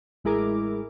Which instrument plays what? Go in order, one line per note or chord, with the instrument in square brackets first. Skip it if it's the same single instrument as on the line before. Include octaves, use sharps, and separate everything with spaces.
[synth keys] A1 G#3 E4 G#4 A#4 D6